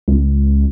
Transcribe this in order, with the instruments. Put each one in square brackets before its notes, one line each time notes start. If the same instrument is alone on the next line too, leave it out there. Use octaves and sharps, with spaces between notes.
[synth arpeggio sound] C#2